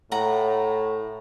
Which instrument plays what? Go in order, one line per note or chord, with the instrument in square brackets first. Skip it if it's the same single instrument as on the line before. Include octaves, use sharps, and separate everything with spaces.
[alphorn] A2 [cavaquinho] F#5 A#5